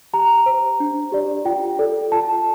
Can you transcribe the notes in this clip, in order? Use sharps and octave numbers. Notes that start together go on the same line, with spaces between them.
G4 A#5
C5
D4
G4 D5
F4 G5
A4 D5
F4 A5